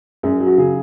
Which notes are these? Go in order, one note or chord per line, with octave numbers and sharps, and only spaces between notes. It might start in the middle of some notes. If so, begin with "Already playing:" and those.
F#2 G#4
F#3
F#4
C#3 G#4